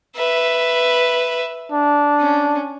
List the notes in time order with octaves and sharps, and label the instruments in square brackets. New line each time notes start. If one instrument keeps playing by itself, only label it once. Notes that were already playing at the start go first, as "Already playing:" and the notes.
[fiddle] B4 E5
[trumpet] D4
[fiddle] C#4